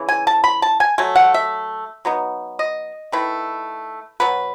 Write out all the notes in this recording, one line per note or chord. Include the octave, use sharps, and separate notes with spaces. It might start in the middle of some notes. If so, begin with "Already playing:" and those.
Already playing: C#3 E3
G#5
A5
B5
A5
G#5
F#3 A3 G#5
F#5
E5
F#3 B3 D#4
D#5
D#3 A3 E4 B4
B2 F#3 B4